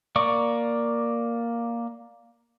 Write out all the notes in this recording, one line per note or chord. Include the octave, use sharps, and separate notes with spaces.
A#3 D5 C#6